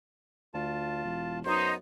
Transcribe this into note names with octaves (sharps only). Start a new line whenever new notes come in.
D2 F4 A5
E1
F#2 B3 D#4 C5